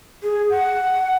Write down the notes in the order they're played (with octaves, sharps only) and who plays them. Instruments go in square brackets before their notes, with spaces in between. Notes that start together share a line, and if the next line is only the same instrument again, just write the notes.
[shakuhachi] G#4
F#5